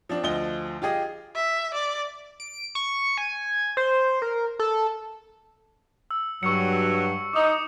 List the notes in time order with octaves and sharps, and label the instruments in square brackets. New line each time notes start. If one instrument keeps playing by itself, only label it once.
[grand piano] F3 C4 D4
D2 F3 D#5 G7
F4 G4 G#4 D#5
[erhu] E5
D5
[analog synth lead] D7
C#6
G#5
C5
A#4
A4
[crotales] E6
[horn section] G2 F#3 [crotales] C#6 E6 C#7
[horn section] D#4 [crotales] D6 D#6